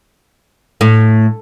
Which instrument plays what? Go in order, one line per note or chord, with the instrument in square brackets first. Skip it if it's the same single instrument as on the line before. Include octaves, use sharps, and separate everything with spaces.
[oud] A2